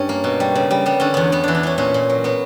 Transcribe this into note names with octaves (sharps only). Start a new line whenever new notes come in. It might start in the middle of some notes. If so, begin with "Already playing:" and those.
Already playing: G2 C#4 C#5
A#3
B2
G3
C#3
G3
G3 B3
D3 C#4
E2 B3
E2 B3
E3 D4
D4
E3 C#4
A#2 C#4
A#2
F#3
F#3 B3